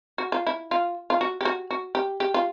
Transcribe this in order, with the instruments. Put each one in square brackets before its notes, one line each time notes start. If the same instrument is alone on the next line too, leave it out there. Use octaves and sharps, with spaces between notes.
[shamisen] F#4
F4
E4
F4
F4
F#4
G4
F#4
F#4
G4
G4
F4